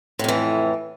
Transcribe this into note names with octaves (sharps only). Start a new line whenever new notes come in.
F2 A2 E3